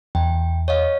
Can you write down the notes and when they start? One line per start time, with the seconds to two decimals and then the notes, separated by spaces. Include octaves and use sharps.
0.15 E2 G5
0.68 C#5 D#5 F5